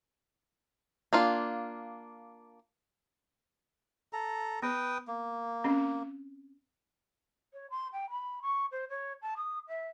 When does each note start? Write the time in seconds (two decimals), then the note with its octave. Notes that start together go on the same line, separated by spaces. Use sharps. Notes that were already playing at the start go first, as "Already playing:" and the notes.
1.13 A#3 D4 F4
4.13 A4 A#5
4.63 B3 B4 G5 D#6
5.08 A#3
5.64 C4 C#4
7.53 C#5
7.70 C6
7.93 G5
8.10 B5
8.42 C#6
8.72 C5
8.90 C#5
9.22 A5
9.37 D#6
9.68 E5